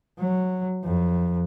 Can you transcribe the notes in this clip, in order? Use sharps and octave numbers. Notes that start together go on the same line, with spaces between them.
F#3
F2